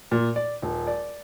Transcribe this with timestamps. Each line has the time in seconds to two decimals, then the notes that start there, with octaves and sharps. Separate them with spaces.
0.11 A#2
0.36 D5
0.62 D#1
0.87 D5